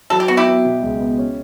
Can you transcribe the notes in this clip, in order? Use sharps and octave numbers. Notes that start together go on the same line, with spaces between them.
F#3 A4
G4
B3 F#4
E4 G4
B3
B2
C#2
B3
C#4